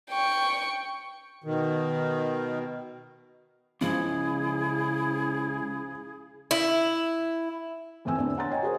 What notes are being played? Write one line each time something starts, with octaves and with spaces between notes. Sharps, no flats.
G5 C#6
B2 D#3
C#2 C#3 F3 E4 G#4
E4
F2 A2 E3 C4 G#5 E6
E2 D3 E3 C4
C#5 F#5 A#5 C6 A6
C#5 D#5 G5 G#5
F#4 G#4 A#4 C5